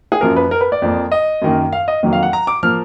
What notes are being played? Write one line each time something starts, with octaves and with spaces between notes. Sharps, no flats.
G#4
F#2 F3 A#3 A#4
B4
A#4
B4
D5
F2 F3 A#3
D#5
F#2 D#3 A#3
F5
D#5
F2 D#3 F#3 A#3
F5
F#5
A#5
D6
F3 A#3 F6